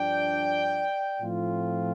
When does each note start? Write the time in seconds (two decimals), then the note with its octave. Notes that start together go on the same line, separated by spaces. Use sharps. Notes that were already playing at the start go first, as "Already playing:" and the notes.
Already playing: G2 F3 D4 D5 G5
1.20 A2 F3 A3 C4 F4